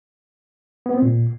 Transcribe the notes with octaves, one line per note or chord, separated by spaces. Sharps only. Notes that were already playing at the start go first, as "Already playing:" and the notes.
B3
C4
A#2